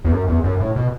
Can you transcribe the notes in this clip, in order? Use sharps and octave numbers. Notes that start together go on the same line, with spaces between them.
E2
F#2
E2
F#2
A2
B2